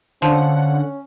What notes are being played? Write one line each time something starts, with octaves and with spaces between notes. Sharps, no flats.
D3 F3 C#4 F#5